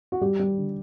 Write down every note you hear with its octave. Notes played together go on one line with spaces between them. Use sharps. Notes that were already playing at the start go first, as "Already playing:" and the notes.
F#4
G3 G4
G3
D3